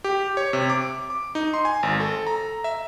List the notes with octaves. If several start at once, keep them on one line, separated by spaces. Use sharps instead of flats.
G4
C#5
C3
D6
D6
D#4
C6
G#5
G#1
A4
A#5
E5